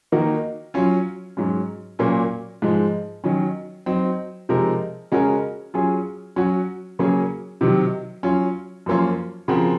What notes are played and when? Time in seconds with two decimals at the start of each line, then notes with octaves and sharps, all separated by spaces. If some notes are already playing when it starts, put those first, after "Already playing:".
0.12 D#3 A#3 D#4 F#4 A#4
0.74 F#3 C#4 F4
1.37 G#2 F#3 C#4
1.99 A#2 F#3 A#3 C#4 F4
2.62 G#2 F3 G#3
3.24 D#3 F#3 C#4
3.86 F#3 C4 D#4
4.49 C3 F3 G#3 D#4 A#4
5.12 C#3 G#3 C#4 F#4 A#4
5.74 F#3 C#4 F4 G#4
6.36 F#3 C#4 F#4
6.99 C#3 F#3 A#3 C#4 G#4
7.61 C3 D#3 F#3
8.23 F#3 C#4 F4
8.86 F#2 F3 A#3 C#4 F4
9.48 C#3 F3 C4 F#4 A#4